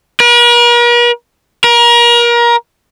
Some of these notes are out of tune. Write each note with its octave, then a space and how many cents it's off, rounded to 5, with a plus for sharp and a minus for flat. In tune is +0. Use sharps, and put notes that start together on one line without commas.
A#4 +45
A#4 +30